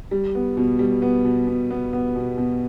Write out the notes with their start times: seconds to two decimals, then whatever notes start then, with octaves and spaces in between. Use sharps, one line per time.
0.11 G3
0.35 B3
0.57 B2
0.79 G3
1.02 B3
1.24 B2
1.47 B2
1.71 B3
1.93 B3
2.16 B2
2.37 B2